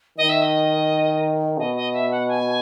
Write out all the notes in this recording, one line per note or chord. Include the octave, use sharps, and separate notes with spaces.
D#3 D#5
E5
D#5
B2 D#5
D#5
E5
F#5
G#5